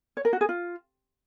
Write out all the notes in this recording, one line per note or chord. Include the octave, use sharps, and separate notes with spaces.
C#5
A#4
F#4
G#4
F4